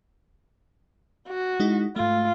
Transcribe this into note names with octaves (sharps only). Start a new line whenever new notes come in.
F#4
G#3 D#4 E4
G#2 A3 F4